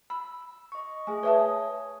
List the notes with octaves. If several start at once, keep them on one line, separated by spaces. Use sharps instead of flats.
B5 E6
D#5 C#6
A3 G#4 G#5
B4 C#5 E5 A5 D#6